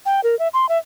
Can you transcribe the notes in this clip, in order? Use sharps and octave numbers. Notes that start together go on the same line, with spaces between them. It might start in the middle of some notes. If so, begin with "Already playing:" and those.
G5
A#4
E5
C6
E5